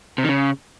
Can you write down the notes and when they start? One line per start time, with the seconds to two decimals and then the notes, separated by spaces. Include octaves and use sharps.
0.18 C3
0.23 D#3
0.29 C#3